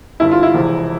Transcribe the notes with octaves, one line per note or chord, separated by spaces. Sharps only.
G1 G2 D3 E4
F4
E4
E1 E2 C3 F3 C4